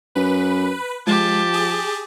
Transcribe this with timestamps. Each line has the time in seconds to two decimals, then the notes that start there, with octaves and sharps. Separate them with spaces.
0.15 F#2 B4
1.07 F3 G#3 G4 A5
1.53 G#4